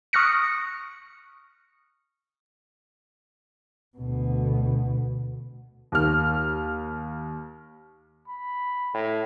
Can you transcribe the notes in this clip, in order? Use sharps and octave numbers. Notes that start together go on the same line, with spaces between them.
C#6 D#6 F6 F#6 A#6 C#7
D2 B2
D#2 F6
B5
A2